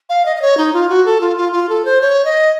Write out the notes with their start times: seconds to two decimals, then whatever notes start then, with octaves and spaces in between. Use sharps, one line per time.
0.09 F5
0.26 D#5
0.36 D#5
0.42 C#5
0.57 D#4
0.73 F4
0.89 F#4
1.05 A4
1.21 F4
1.37 F4
1.52 F4
1.69 A4
1.85 C5
2.01 C#5
2.25 D#5